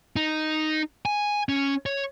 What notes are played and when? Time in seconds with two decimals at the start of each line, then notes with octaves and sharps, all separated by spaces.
0.16 D#4
1.05 G#5
1.49 C#4
1.86 C#5